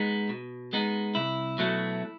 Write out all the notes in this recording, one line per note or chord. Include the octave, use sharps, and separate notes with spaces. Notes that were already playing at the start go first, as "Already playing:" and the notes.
Already playing: G#3 B3 D#4
B2
G#3 B3 D#4
C2 E4
B2 F#3 A3